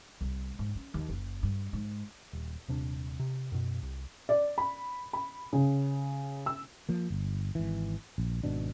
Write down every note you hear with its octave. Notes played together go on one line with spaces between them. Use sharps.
C2
G#2
C#4
D#2
F#1
G2
G#2
D#1
D#1 C3 D4
C3
F#2 B2
C2
D5
B5
B5
C#3
E6
F3 A#3
G1
G#1 E3
A#1
G#1 B2 D4